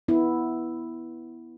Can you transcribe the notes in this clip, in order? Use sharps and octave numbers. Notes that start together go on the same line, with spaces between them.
B3 E4